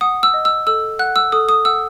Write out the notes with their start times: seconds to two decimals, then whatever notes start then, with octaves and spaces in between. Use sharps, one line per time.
0.01 F#5 D#6
0.23 E6
0.34 D#5
0.45 E6
0.67 A4 E6
0.99 F#5 F#6
1.16 E6
1.32 A4 D#6
1.49 D#6
1.65 F#5 E6